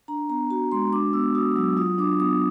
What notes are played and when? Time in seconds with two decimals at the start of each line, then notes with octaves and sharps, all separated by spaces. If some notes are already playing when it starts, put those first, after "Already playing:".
0.08 D4 A#5
0.29 B3 A#5
0.50 F#4 A#5
0.72 G#3 C6
0.93 D4 D6
1.13 B3 E6
1.35 F#4 D#6
1.56 F#3 E6
1.77 F4 D#6
1.98 D4 D6
2.20 B3 D#6